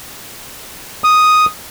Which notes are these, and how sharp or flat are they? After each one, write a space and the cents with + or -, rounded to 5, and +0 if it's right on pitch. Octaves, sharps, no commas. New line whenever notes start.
D#6 +0